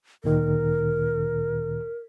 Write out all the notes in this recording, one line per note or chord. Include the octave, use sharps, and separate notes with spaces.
D2 A#2 D#3 A#4